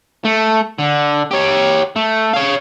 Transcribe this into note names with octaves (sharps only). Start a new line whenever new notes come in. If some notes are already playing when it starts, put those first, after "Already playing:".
A3
D3
G4 C#5
A3
C#5 F5